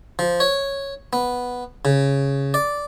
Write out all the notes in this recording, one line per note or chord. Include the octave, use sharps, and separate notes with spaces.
F3
C#5
B3
C#3
D5